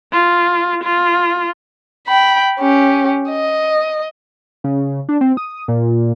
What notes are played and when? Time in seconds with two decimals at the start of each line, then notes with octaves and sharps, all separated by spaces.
0.13 F4
0.84 F4
2.07 G5 B5
2.59 C#4 G4
3.30 D#5
4.64 C#3
5.09 D4
5.21 C4
5.37 D#6
5.68 A#2